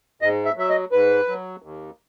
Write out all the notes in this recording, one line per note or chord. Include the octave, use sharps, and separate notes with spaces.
G#2 D#5
E5
F#3 E5
D#5
G#2 B4
F#3
D#2